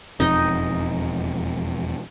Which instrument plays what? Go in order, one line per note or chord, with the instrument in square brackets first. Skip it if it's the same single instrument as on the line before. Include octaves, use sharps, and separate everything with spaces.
[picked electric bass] E1 F2 [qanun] D#4 D#5